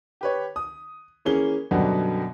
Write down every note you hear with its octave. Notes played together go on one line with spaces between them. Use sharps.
G4 B4 C#5
D#6
E3 A#3 C#4 G#4 G7
F#2 B2 D3 F#3 G3 B3